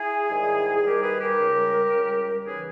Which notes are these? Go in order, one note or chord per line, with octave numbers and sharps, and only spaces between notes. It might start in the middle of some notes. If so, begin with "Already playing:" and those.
Already playing: E4 G#4
G#2 D#3 G3
G#4
D#2 D#3 G3 G4 A#4
G#4 B4
G4 A#4
C#2 C#3 G3
C#2 C#3 G3
D#2 C#3 E3 G#4 B4